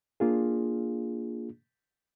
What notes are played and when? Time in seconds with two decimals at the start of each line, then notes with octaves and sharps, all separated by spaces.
0.20 A#3 D4 F4 G#4